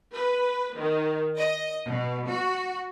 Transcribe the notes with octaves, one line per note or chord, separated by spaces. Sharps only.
B4
D#3
D#5
B2
F#4